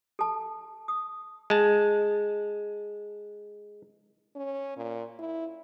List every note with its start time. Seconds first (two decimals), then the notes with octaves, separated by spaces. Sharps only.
0.19 A4 A5
0.88 D#6
1.50 G#3 A5
4.35 C#4
4.77 A#2
5.19 E4